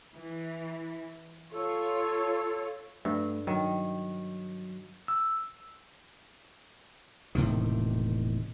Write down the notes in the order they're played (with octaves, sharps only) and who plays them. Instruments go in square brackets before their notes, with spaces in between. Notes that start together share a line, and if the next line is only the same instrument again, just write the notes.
[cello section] E3
[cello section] F4 C#5 [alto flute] A4
[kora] G2 [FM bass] A3
[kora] D#3 [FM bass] F#3
[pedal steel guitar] E6
[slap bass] E1 A2 C3 D#3